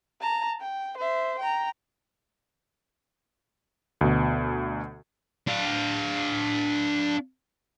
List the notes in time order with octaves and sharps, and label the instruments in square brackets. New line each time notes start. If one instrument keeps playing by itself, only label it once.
[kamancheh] A5 A#5
G5
C5 E5
G5 A#5
[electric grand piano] D2 B2
[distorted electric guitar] D4 F5